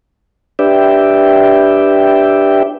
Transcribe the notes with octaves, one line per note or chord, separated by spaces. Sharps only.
D4 G4 B4 D5 E5 G5